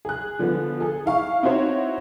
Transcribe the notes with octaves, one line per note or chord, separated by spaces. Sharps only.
G#4 F#6
D3 F3 B3
G#4 A4
E4 F5 C#6
C4 D#4 E4 F#4 C5 C#5